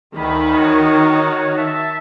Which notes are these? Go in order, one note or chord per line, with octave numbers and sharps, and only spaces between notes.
D2 D#3 B5
F#4 C#5
E5 A5